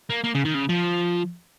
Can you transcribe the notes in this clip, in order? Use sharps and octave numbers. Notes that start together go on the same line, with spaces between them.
A#3
A#3
C#3
D#3
C#3
F3